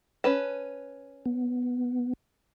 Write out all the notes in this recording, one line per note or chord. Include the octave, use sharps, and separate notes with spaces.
C#4 B4 A5
B3